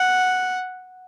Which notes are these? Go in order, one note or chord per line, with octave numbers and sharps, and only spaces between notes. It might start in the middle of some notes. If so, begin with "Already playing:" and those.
Already playing: F#5